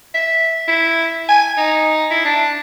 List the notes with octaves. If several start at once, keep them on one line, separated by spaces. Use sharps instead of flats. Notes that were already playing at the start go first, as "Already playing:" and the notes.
E5
E4
G#5
D#4
E4
D4